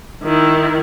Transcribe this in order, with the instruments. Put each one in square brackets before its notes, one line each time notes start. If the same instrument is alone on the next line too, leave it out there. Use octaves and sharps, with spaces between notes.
[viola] D#3 E4